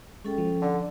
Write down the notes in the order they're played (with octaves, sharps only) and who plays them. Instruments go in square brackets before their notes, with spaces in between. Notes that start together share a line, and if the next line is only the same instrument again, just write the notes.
[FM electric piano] G#3 [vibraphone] C#4 A4 G5
[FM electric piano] F3
[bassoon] D3